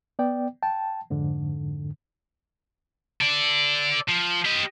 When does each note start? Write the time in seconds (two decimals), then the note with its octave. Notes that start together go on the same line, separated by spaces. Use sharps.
0.19 B3 D5 G5
0.63 G5 A5
1.10 F2 G#2 D3
3.21 A4 D5
4.09 F3
4.45 G4 D#5